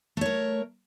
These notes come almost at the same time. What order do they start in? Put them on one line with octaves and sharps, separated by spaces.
A3 C#5 A#4